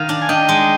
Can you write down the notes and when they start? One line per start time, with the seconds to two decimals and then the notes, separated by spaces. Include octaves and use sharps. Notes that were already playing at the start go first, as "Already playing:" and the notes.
Already playing: D#3 F5
0.09 D4
0.22 G#5
0.29 D4 D#5 G5
0.49 G#3